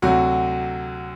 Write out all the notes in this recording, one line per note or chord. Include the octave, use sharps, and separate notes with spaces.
D2 C3 F#3 F#4